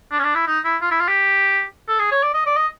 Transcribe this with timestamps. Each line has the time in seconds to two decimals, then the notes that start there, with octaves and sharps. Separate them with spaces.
0.11 D4
0.19 C#4
0.23 D4
0.35 E4
0.47 D#4
0.64 E4
0.81 F4
0.91 E4
1.00 F4
1.08 G4
1.88 A4
1.99 G#4
2.11 C#5
2.23 D5
2.34 D#5
2.46 D5
2.56 D#5